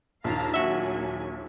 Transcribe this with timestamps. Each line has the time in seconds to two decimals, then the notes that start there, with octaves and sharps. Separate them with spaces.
0.24 A#1 D#2 F5 A5 A#5
0.54 F#3 A#3 F#4 E5 G#5